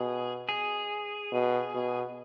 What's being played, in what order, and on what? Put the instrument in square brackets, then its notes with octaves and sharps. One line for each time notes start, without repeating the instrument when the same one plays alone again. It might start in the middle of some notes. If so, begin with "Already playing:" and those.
Already playing: [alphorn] B2 [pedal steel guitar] G#4
[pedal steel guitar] G#4
[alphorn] B2
B2